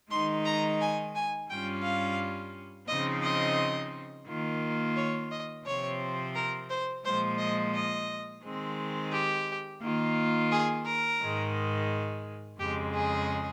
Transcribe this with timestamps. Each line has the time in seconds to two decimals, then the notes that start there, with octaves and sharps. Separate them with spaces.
0.10 D#3 G#3 D#4 C6
0.45 A#5
0.80 G#5
1.15 G#5
1.50 G2 G3 C#4 F4 G5
1.84 F5
2.88 C#3 F3 C4 D#4 D#5
3.23 D#5
4.27 D#3 A#3 F4
4.96 C#5
5.31 D#5
5.65 C3 F3 C4 C#5
6.35 A#4
6.69 C5
7.05 A#2 F3 G#3 C5
7.39 D#5
7.74 D#5
8.44 D#3 G#3 C4
9.13 G4
9.82 D#3 A#3 F4
10.51 G#4
10.86 A#4
11.21 G#2 D#3 G#3
12.59 F2 C#3 G#3 G4
12.94 G#4